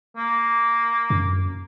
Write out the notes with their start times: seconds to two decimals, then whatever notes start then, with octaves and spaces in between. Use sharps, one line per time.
0.17 A#3
1.10 F#2